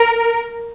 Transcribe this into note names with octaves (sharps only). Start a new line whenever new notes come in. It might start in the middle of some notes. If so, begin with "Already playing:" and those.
Already playing: A#4